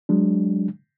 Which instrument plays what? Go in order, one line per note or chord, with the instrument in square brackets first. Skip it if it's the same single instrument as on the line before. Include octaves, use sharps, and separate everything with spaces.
[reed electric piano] F#3 G#3 D4